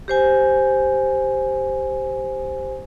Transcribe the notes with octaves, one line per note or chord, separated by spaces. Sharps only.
G4 C5 G#5